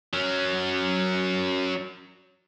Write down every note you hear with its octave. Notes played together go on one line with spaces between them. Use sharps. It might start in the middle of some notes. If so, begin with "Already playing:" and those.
F#3 C#4